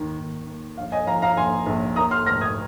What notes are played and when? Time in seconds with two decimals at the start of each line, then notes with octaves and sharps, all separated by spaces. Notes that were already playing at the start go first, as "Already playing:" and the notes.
Already playing: D#2 D#3
0.18 D#2
0.47 A#3
0.77 A#1 F5
0.92 D#5 G#5
1.07 F3 F5 A#5
1.22 F5 A#5
1.37 A#1 G#5 C6
1.66 A#1
1.96 A#3 A#5 D#6
2.11 C6 F6
2.26 F1 F6 A#6
2.41 D#6 G#6